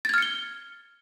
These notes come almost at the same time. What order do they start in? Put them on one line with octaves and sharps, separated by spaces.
A6 G#6 F6 C#7 G7